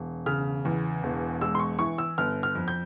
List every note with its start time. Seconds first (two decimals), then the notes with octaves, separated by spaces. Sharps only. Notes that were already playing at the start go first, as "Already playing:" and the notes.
Already playing: E1
0.26 C#3 F6
0.65 E2
1.03 E1
1.41 G#3 E6
1.55 C6
1.59 C#6
1.79 E3 C#6
1.98 E6
2.18 G1 F6
2.43 F6
2.55 F2
2.68 G6